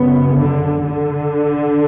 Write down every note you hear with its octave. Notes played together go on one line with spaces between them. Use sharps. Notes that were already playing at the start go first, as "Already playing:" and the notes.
Already playing: F#2 C#3 B3
D3
D3